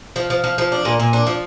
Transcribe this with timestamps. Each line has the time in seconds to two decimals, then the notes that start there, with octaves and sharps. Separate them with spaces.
0.16 F3
0.30 F3
0.44 F3
0.58 F3
0.72 D4
0.85 A#2
1.00 A#2
1.13 D4
1.26 F3